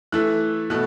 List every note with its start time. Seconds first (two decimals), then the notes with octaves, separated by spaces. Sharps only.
0.12 E3 A3 E4 F#6
0.70 B2 A3 F#6